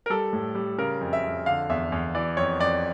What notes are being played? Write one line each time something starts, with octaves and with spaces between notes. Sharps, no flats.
A#4
G3 A4
A2
G3
C#3 A#4
F2
E5
F2
D3 F5
E2 E5
E2
E3 D5
F2 C#5
F2 D5